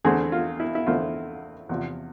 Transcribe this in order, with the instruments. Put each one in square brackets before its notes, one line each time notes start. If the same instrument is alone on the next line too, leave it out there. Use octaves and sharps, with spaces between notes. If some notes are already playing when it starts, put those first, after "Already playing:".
[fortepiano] E2 D3 A3 C4 G#4
F4
E4
E4
E2 D3 A3 C4 F4
E2 C3 F3